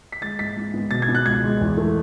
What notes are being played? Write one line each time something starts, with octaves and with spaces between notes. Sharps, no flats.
B6
G#3 A6
G#2 B6
G#2
B3
B2 A6
G#6
B3
F#6
C#2 G#6
G#3
E2
A3